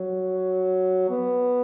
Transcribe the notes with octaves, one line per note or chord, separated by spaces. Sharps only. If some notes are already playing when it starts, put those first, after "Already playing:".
Already playing: F#3
B3